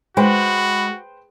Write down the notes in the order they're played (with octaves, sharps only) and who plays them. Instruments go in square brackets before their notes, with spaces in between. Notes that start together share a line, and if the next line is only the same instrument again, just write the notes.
[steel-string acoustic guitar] G#3 [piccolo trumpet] F#4 [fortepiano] B4 C5 G5 [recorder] B5